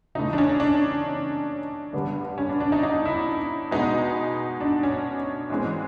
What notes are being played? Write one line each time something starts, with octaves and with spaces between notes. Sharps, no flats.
C#3 E3 A3 D#4
D4
C#4
D4
G2 D3 G3 B3
C#4
D4
D4
D#4
D#4
E4
B2 G#3 B3 D#4
D4
C#4
G#2 E3 G#3 C4